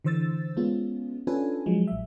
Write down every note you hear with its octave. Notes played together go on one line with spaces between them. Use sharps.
D3 E3 C5 E6 A6
G#3 B3 C#4 F4
C#4 D4 F4 A4 B4 G#5
F3 F#3 G#3
A1 E5